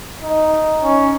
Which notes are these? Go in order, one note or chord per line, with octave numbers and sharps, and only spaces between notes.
D#4
C#4